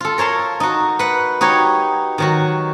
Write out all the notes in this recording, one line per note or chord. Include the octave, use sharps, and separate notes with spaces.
F4 A4
A#4 C#5 A5 C6
D#4 F#4
B4 F#5
D#4 F#4 G4 C#5
D#3 F#3 F#4